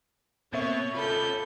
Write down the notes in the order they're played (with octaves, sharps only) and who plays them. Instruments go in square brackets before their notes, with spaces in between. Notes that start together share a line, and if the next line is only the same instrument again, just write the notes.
[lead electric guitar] B2 [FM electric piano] A#3 C4 E5 [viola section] C#5
[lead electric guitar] C#4 F4 [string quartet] A4 G6 [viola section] B5